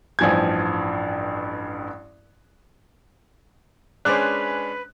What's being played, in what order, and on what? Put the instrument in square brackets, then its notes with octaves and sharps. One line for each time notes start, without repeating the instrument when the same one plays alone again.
[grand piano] A1 G2 F3 G#5 G#6
[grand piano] G#3 C#4 D4 [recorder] B4 [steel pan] C5 D5 [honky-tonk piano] F#6